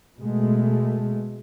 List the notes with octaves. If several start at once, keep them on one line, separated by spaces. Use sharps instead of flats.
B2 G#3 A3